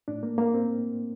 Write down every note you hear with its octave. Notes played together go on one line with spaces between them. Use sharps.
A2 D4
A#3
A#3
C4